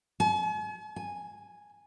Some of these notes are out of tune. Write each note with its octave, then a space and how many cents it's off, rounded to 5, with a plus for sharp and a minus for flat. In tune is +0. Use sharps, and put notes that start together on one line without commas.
G#5 +45
G#5 -5